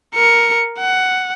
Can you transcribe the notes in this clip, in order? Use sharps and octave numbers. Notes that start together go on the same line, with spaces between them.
A#4 C#7
F#5